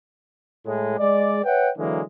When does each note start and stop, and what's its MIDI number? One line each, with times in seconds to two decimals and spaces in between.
0.66 0.94 45
0.66 0.94 56
0.98 1.40 56
0.98 1.40 74
1.45 1.70 71
1.45 1.70 73
1.45 1.70 76
1.45 1.70 78
1.45 1.70 79
1.77 2.02 50
1.77 2.02 52
1.77 2.02 54
1.77 2.02 56
1.77 2.02 58